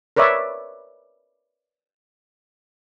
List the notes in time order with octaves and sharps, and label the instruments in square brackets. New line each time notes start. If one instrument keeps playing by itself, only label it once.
[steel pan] A#4 B4 C#5 D5 E5